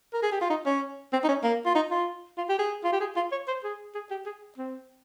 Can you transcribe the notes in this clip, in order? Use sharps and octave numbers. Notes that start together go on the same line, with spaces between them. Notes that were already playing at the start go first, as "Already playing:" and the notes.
A#4
G#4
G4
F4
D#4
C#4
C4
D#4
C#4
A#3
F4
D#4
F4
F4
G4
G#4
F4
G4
G#4
F4
C#5
C5
G#4
G#4
G4
G#4
C4